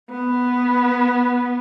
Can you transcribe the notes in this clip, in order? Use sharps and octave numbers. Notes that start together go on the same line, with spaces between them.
B3